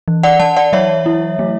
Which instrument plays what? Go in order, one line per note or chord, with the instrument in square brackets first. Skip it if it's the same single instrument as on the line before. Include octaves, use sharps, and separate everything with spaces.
[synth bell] E3
D5 F#5
E3 F#5 A5
D5 F#5
F#3 C#5 E5
E4
A3